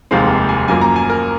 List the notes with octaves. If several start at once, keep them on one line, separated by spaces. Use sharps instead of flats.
F1 D#2 D#3 G#3 C4 F5
G#5
F#2 F3 A#3 G#5
A#5
G#5
A#4